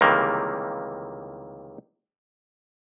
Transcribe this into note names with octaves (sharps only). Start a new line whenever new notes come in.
C#2 C3 D#3 E3 G3 A#3